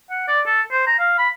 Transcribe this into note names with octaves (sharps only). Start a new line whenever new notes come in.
F#5
D5
A4
C5
A#5
F5
B5